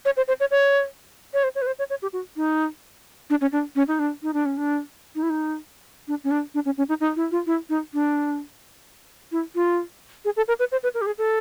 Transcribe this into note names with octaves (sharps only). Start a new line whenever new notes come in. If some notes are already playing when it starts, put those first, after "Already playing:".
C#5
C5
C5
C#5
C#5
C#5
C5
C#5
B4
C5
C#5
C#5
G4
F#4
D#4
D4
C#4
D4
C#4
D#4
D4
D#4
D4
C#4
D4
D#4
E4
D#4
D4
C#4
D4
D4
C#4
C#4
D#4
D#4
E4
F4
E4
D#4
D4
E4
F4
G#4
A4
A#4
B4
C5
B4
A#4
G4
G#4
A4